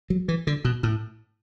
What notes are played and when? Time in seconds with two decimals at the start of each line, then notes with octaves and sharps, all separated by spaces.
0.10 F#3
0.28 E3
0.47 D3
0.65 B2
0.83 A2